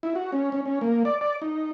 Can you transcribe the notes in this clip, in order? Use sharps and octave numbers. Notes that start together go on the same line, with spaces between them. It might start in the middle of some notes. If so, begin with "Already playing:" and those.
E4
F#4
C#4
C#4
C#4
A#3
D5
D5
D#4